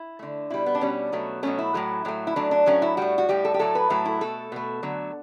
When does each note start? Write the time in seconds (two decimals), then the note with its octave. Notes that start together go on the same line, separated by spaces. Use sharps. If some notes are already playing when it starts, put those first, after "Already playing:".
Already playing: E4
0.19 D3 A3
0.50 B2 G3 E4
0.66 B3
0.75 D4
0.81 B2 G3 C#4
1.12 B2 F#3 A3
1.43 B2 F#3 A3 C#4
1.59 E4
1.74 A2 F#3 A3
2.05 A2 F#3 A3
2.27 E4
2.36 A2 F#3 A3 D4
2.51 D4
2.66 A2 F#3 A3 C#4
2.82 E4
2.97 A2 G3 F#4
3.18 F#4
3.29 A2 G3 G4
3.45 A4
3.54 G4
3.59 A2 F#3 A3 A4
3.75 B4
3.90 A2 F#3 A3 A4
4.05 E4
4.21 B2 A3 A4
4.52 B2 A3
4.83 D3 F#3 A3